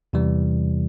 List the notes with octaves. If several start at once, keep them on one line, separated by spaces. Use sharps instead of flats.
E2 C3 E3 G3